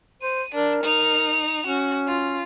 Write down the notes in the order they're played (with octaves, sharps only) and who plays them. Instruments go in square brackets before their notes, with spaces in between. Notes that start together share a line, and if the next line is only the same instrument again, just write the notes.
[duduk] C5 [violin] D#7
[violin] D4 [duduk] A#4
[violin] D#4 F7
[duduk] C#4 [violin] F#4
[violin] F4